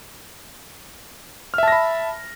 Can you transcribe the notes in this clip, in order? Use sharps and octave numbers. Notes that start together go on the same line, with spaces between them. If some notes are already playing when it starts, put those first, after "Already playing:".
E5 A5 B5 F6 A#6